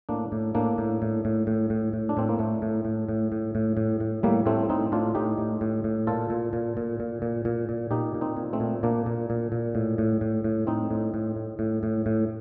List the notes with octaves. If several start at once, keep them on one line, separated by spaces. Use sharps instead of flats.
A2 A#3 D4
A2
A2 A#3 D4
A2
A2
A2
A2
A2
A2
D4
A2 C4
A#3
A2 A3
A2
A2
A2
A2
A2
A2
A2
A2 G3 A#3
A2 A3 C4
A2 C4 D#4
A2 D4 F4
A2 D#4 G4
A2
A2
A2
A#2 F4 A4
A#2
A#2
A#2
A#2
A#2
A#2
A#2
A#2 D#4 G4
A#2
C4 D#4
A#2
A3 C4
A#2
A#2 A#3 D4
A#2
A#2
A#2
A2
A2
A2
A2
A2 C4 D#4
A2
A2
A2
A2
A2
A2